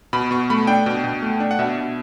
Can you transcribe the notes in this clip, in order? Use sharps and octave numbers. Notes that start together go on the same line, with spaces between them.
B2 B5
B2 C#6
A3 B5
D4 G5
B2
B2
A3
D4
F#5
B2 E5
B2